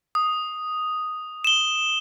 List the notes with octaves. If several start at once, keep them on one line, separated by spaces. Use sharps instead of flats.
D#6
E7 G7